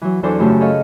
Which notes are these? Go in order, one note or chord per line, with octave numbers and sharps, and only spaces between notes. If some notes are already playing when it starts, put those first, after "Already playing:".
E3 F#3
E2 E3 F#3 D4 A4 C5
F#2 C#3 A3 G4 A5
G#4 A4 C#5 D#5 F5